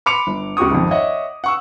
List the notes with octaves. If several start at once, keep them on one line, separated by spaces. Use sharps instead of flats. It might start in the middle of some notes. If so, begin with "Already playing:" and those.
B5 C6 D6 C#7 D7 F7
G1
C#2 F#4 G4 C#6 D#6
G#1 F2
C#5 D#5 E5 F#5
F#5 C#6 E6